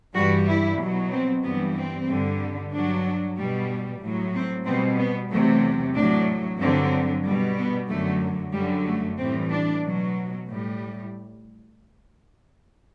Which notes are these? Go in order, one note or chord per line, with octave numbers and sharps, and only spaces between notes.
G2 E3 G3 F#4
E4
B2 F#3
C4
G2 E3 G3 B3
C4
G2 D3 G3
G2 F#3 D4
B2 G3
A2 F#3
C4
B2 G3 C4
B3
E2 C3 F#3 A3
A2 F#3 D4
G2 D3 F#3 C4
B2 G3
B3
F#2 D3 F#3 A3
F#2 D3 F#3 G3
A3
A2 E3 G3 C4
D4
B2 F#3
A2 G3